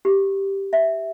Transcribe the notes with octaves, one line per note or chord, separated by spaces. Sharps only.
G4
E5